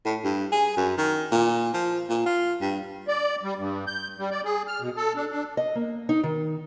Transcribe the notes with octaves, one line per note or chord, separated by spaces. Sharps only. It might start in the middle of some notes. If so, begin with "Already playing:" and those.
A2
G2
G#4
F#2
D#3
A#2
F3
A#2
F4
G2
D5
G3
G2
G6
G3
D5
G#4
F6
B2
A4
D4
D4
D#5
A#3
D#4
D#3